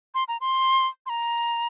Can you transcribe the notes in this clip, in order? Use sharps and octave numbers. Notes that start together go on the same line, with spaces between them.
C6
A#5
C6
C6
A#5